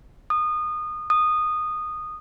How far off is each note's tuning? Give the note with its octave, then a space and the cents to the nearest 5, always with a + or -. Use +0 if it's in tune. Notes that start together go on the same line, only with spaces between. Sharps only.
D#6 -25
D#6 -15